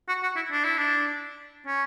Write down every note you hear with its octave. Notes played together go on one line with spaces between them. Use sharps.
F#4
F#4
E4
D4
E4
D4
C#4